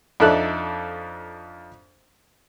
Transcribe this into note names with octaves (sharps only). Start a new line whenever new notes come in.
F2 D4 D#4 A4 E5 F#6